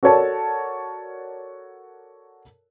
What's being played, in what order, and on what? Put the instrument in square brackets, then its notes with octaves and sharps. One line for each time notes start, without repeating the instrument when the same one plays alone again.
[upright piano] F#4 A4 A#4 C#5 D5 A5